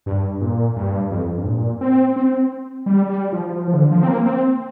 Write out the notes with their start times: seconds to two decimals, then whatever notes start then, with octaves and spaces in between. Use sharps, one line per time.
0.06 G2
0.41 A#2
0.76 G2
1.11 F2
1.37 G2
1.46 A#2
1.81 C4
2.16 C4
2.86 G3
3.09 G3
3.32 F3
3.56 F3
3.68 F3
3.74 D3
3.91 F3
4.03 C4
4.08 A#3
4.26 C4